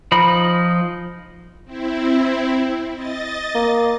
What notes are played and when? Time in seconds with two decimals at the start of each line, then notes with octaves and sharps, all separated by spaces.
0.12 F3 D#4 B5
1.65 C4 E4
2.95 D#5 A6
3.55 A#3